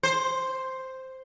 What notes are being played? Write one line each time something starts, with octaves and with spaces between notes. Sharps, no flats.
C5